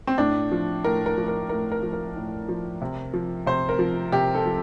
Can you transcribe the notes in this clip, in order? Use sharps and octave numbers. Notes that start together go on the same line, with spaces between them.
C4
A2 D4
F3
A2 A#4
A#4
F3
A#4
A2 A#4
A#4
F3
A#4
A2
F3
C3
F3
C3 C5
A#4
F3
C3 G4
A4
F3